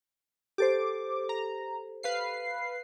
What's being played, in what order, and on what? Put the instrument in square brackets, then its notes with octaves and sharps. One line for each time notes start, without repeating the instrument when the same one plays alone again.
[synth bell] G4 A4 C5 [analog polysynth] D6
[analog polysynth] A#5
B4 F5 C7